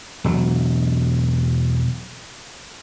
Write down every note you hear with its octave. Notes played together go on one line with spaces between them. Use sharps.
E1 F#3